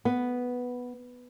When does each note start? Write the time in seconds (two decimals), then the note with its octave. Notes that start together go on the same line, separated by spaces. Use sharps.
0.05 B3